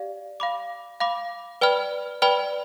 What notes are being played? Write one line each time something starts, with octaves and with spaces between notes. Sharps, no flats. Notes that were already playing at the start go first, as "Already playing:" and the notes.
Already playing: G4 D5 F5
F5 B5 D6
F5 B5 D6
B4 D5 G5 B5 F6
B4 D5 G5 B5 F6